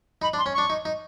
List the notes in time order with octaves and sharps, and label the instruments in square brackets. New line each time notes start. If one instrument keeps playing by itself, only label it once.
[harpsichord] D#4 [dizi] B5
[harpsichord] D4
[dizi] C6
[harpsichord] C#4
[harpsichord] D4 [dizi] C#6
[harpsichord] D#4
D#4